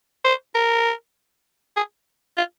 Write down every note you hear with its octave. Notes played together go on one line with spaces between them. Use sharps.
C5
A#4
G#4
F4